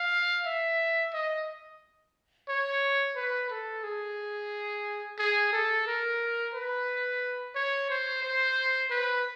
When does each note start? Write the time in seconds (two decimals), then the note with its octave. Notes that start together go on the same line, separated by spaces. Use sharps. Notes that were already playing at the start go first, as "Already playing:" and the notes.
Already playing: F5
0.46 E5
1.14 D#5
2.49 C#5
3.16 B4
3.50 A4
3.83 G#4
5.19 G#4
5.53 A4
5.87 A#4
6.54 B4
7.55 C#5
7.90 C5
8.23 C5
8.91 B4